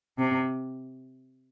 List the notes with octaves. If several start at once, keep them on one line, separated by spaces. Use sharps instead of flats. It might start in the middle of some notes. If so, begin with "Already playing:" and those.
C3